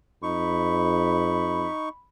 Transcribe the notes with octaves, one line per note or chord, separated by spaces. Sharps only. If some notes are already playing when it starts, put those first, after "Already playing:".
F2 D#4 B5 C#6